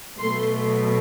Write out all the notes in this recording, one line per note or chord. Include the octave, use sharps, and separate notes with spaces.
B2 F#3 A3 C6